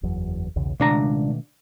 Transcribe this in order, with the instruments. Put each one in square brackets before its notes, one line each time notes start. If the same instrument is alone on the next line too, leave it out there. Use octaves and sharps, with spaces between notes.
[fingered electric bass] F#1 E2 F#3
B1 E2 C#3
[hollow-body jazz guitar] C#2 D4 A#5 [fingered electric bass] B2 D#3 A3